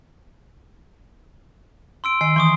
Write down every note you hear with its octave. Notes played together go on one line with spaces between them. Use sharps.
C6 E6 D7
D#3 G#5 E6 C7
E3 C6 C#6 D#6